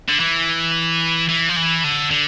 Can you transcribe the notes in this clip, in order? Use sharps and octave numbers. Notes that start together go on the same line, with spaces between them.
D3
E3
E3
F3
E3
D3
D3